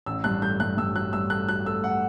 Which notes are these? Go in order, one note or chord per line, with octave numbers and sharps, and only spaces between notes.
A1 E6
G2 F#6
A3 G6
G2 F#6
G2 E6
F#3 F#6
G2 E6
A3 F#6
F#3 F#6
A3 E6
F#5